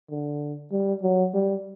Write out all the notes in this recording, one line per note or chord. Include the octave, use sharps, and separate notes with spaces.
D3
G3
F#3
G3